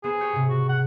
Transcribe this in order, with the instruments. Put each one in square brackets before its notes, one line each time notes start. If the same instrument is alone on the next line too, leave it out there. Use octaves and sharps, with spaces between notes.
[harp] B3 C5 [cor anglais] G#4
[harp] G4 C#5 G6
G#2 C3
[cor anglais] F#4
F#5